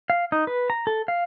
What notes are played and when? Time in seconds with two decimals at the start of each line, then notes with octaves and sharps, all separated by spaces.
0.10 F5
0.32 D#4
0.47 B4
0.70 A#5
0.87 A4
1.08 F5